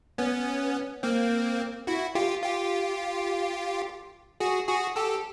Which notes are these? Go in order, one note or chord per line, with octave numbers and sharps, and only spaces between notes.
B3 C#4
A#3 C4
E4 F#4
F4 G4
F4 G4
F#4 G#4
F#4 G#4
G4 A4